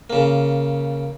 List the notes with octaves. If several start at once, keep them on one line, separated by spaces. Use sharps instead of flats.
C#3 A#3